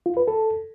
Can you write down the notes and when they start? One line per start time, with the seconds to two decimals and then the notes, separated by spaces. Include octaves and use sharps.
0.06 F4
0.17 B4
0.28 A4